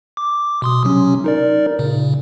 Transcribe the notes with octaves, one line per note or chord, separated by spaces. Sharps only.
D6
B2 C6 D#6
C3 F#3 C#4
D#4 A#4 D5
A#2 C#3